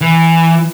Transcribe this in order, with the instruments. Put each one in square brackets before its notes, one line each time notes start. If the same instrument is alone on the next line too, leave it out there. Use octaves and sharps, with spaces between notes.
[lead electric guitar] E3